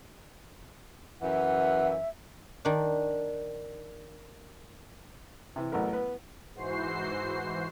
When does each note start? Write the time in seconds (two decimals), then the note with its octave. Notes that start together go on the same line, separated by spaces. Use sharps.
1.22 F#2 E3 E5 F#5
2.65 D#3 D4
5.56 C3 E3
5.72 A1 F#3 A3 B3 A#4
5.93 B3 B4
6.54 G#2 E3 F#4 C5 C7